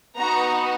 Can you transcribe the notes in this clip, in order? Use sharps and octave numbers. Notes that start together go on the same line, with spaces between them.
B3 D#4 F#4 A#5